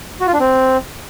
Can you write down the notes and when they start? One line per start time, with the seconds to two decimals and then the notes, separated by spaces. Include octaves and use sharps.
0.21 F#4
0.27 F4
0.33 D4
0.40 C4